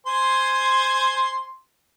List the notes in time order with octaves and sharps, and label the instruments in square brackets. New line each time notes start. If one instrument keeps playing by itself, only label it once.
[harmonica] C5 G#5 C6